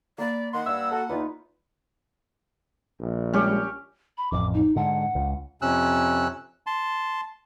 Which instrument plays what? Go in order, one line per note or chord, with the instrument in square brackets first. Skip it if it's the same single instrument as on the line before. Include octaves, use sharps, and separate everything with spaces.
[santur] A#3 B5 [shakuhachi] D5
[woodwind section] D#3 C6 [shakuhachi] F#5
[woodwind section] G2 E6
F#4 A4
[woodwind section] E2 [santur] D#4 F4 B4
[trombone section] A#1
[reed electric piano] G3 G#3 [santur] C#4 G4
[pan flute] B5
[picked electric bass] A1 F2 [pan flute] D6
[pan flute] D#4
[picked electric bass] G#2 D3 [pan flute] F#5
[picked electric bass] C#2
[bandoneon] F2 C3 C#4 E6 F#6
A5 C6